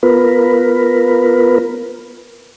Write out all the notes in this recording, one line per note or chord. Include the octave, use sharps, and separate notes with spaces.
B3 F4 A#4 B4